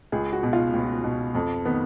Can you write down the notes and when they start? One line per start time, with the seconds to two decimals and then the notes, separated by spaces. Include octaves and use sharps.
0.12 C#2 G#4
0.33 F#4
0.43 B2
0.53 F4
0.73 C#2
1.04 B2
1.35 F2
1.65 D#3 B3